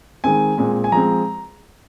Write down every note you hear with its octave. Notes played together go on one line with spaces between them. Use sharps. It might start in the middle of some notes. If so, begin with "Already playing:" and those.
D#3 G#3 C4 G#5
A#2 G#3 C4
G#5
F3 G#3 C4 A#5